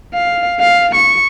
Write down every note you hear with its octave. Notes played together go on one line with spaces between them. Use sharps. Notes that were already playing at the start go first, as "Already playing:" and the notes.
F5
F5
C#6